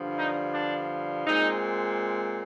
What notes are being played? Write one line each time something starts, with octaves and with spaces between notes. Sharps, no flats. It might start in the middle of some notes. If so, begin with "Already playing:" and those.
Already playing: G2 D3 F3
D#4
D4
A#2 G#3 C4 D#4